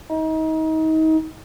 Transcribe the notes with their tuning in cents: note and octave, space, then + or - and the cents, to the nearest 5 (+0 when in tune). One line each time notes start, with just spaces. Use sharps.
D#4 +30